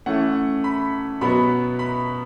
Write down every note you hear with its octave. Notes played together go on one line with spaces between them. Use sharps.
E3 A3 C#4 F#5
B5
B2 F#3 B3 B5
B5